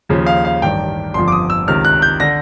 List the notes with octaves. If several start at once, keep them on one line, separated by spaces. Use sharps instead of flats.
D#2 C#3 F3
F5
F5
A1 G2 D#3 G5
G1 F2 D3 F3 C6
D6
D#6
E6
C#2 C3 D#3 F6
F#6
G6
D3 A#6